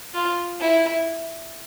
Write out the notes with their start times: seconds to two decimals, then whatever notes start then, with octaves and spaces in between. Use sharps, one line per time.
0.14 F4
0.60 E4